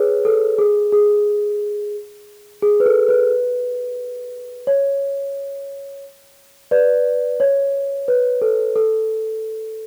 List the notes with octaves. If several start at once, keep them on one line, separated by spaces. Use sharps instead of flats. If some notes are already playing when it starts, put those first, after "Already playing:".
Already playing: G#4 B4 C#5
A4
G#4
G#4
G#4
B4
A4
B4
C#5
B4 D5
C#5
B4
A4
A4